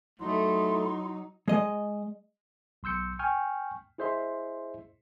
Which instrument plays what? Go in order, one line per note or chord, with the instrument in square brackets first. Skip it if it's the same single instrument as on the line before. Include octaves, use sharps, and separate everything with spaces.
[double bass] F#3 D#4 [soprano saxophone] A3 [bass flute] E4 [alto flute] C6
[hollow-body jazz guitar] G#3 D#5
[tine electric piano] B1 C6 E6 G6 C#7
G5 G#5 C#6 F6 G6
E4 G#4 C5 D#5 E5 C6